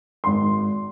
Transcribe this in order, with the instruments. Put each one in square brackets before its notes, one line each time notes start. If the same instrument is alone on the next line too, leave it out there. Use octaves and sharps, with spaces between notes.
[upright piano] G#1 C6